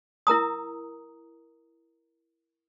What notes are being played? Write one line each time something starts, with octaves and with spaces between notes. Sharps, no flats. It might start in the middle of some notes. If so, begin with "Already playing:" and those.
E4 A#4 A#5 D#6